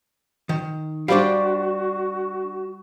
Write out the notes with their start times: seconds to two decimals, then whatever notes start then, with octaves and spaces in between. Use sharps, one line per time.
0.49 D#3
1.08 G3 D4 F#4 C5 D5 F5